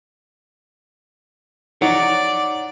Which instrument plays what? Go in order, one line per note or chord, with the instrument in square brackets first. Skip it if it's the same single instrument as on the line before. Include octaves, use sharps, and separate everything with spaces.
[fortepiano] D#4 [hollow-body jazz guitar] C#5 F#5 [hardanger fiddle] D5